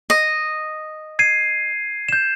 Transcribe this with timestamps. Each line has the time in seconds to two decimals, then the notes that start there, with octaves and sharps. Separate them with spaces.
0.10 D#5
1.19 G#6 C7 D#7
2.09 G6 E7